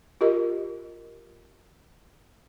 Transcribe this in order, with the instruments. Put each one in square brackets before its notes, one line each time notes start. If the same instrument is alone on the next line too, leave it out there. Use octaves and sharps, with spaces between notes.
[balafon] F4 G4 A#4 D#5